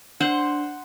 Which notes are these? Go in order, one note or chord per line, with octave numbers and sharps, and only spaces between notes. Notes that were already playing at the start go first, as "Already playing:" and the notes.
D4 C5 F#5